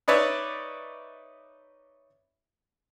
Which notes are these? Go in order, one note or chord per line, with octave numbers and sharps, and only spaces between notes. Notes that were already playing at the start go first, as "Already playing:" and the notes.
D#4 B4 C#5 D5 E5